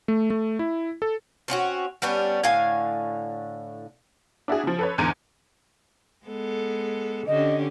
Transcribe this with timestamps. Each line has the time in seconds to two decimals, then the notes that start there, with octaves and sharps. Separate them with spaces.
0.08 A3
0.30 A3
0.59 E4
1.02 A4
1.48 C4 C#4 F4 F#4
2.02 G3 B3 C#4 D4
2.44 A2 D3 F5 G#5
4.48 D4 E4 F#4 G#4
4.63 C#3 F3
4.79 A4 B4 C#5
4.98 E2 G#2 D3 A#5 G#6 D#7
6.26 G#3 B3 A4
7.27 D3 C#4 G4 D#5